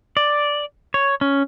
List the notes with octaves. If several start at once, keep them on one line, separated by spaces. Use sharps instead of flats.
D5
C#5
C#4